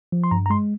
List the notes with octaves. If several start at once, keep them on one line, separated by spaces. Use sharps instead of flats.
F3
C6
G2 A#5
A#5
G#3 C6